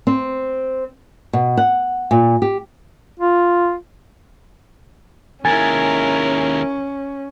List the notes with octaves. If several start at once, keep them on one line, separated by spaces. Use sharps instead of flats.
C4
B2
F#5
A#2
G4
F4
D#2 G#3 C#4 E4 A#4 G#5 G#6 A6